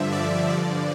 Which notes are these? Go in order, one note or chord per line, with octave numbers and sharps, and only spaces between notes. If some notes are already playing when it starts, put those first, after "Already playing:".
Already playing: G2 D3 F3 E5
D5
G2 D3 F3